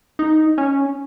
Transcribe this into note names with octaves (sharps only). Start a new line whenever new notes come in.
D#4
C#4